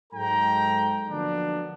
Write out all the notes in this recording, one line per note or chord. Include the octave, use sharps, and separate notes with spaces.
G#2 F#3 G#3 A4 G5 A#5
D3 F3 F#3 A#3 B3 D4